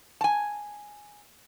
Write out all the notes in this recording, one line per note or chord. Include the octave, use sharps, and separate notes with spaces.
G#5 A5